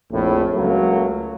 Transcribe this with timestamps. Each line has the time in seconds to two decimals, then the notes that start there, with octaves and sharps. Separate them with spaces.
0.12 A#1 F2 A2
0.55 C#2 F#3 A3 A#3